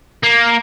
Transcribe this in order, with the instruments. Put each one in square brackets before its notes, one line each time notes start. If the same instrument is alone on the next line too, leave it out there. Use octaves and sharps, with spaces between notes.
[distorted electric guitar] A#3